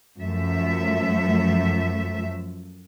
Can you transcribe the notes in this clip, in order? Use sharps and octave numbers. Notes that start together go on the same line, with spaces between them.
F#2 F3 A3 E5